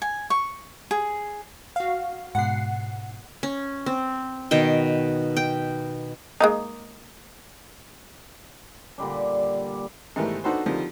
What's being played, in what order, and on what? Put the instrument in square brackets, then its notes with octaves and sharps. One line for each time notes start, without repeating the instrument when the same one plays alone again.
[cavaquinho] G#5
C#6
G#4
[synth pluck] F#4 F5
[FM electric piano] G#2 B2 [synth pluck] F#5 C7
[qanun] C#4
C4
B2 D#3 G5
G5
[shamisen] G#3 A#3 D#4
[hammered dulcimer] A#2 D3 G3 D4
[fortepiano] G#2 D#3 E3 G3 A3
D4 D#4 F#4 A4 B4 C5
D3 D#3 F3 G3 C4 D#4